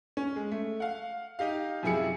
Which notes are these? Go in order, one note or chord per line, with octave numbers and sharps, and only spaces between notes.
C#4
G#3
A3
F5 F#5
D#4 G4 F5
F#2 C3 F3 E4 G#4 C#7